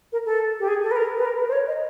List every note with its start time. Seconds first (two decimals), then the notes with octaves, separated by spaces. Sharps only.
0.12 A#4
0.26 A4
0.60 G4
0.68 G#4
0.83 A4
0.91 B4
0.96 A#4
1.17 B4
1.25 A#4
1.39 B4
1.48 C5
1.53 C#5
1.67 D#5